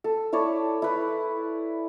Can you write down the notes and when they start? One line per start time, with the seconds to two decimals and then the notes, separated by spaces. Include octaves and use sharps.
0.04 A4
0.32 E4 A4 C#5 D5
0.82 E4 B4